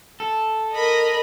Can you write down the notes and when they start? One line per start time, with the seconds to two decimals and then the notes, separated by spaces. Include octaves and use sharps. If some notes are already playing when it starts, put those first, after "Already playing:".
0.20 A4
0.73 A#4 D#5 B5